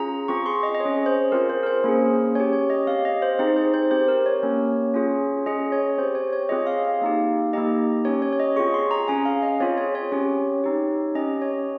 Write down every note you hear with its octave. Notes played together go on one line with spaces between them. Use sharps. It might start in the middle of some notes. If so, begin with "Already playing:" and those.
Already playing: C#4 F4 G#4 A#5
C4 F4 G#4 C#6
C6
D#5
D#5
C#4 G#4 C#5
C5
C4 F4 G#4 A#4
C5
A#4
C5
A#3 C#4 G#4 C5
C#4 G4 C#5
C#5
D#5
C4 G4 F5
D#5
C5
C4 D#4 G#4 C5
C5
C5
C4 G4 C5
A#4
C#5
A#3 C#4 G4
C#4 F4 G#4
C#4 G#4 D#5
C#5
C4 G4 C5
C#5
C#5
C4 F4 G#4 D#5
F5
F5
A#3 D#4 G4
A#3 D#4 G4 D#5
C#4 G4 C#5
C#5
C#5
D#5
C4 F4 G#4 C#6
C6
A#5
C#4 G#4 G#5
F5
D#5
C4 F4 G#4 C#5
C#5
C#5
C#4 G4
C4 D#4 G4
C#4 G4 D#5
C#5